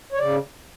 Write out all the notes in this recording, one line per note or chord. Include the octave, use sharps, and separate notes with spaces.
C#5
C#3 D5